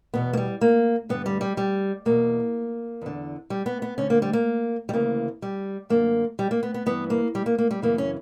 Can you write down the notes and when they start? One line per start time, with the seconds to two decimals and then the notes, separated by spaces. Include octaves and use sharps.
0.14 E2 B2 B3
0.33 A#3
0.37 G3
0.61 A#3
1.09 G2 D3 B3
1.26 G3
1.41 G3
1.57 G3
2.05 E2 B2 A#3
3.02 E2 D3
3.50 G3
3.66 B3
3.82 B3
3.98 D2 D3 C#4
4.10 A#3
4.22 G3
4.33 A#3
4.89 G3
4.93 D2 C#3 E3 A#3
5.42 G3
5.90 F#2 D3 A#3
6.39 G3
6.51 A#3
6.63 B3
6.74 B3
6.86 G2 E3 B3
7.10 A#3
7.35 G3
7.46 A#3
7.58 A#3
7.71 G3
7.82 F#2 C#3 E3 A#3
7.98 C#4